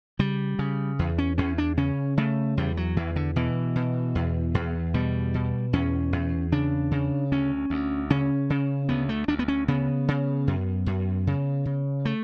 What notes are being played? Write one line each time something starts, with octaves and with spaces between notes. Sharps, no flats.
C#3 G3
C#3
E2
C#4
E2 C#4
D4
C#3 C#4
C#3 A3
E2 G3
F#3
E2 E3
D3
B2 E3
B2
E2
E2
B2 G3
B2
E2 C#4
E2
C#3 D4
C#3
D2 C#4
D2
C#3 C#4
C#3
D2 B3
A3
D2 D4
B3
C#4
C#3 B3
C#3
F#2
F#2
C#3
C#3
A3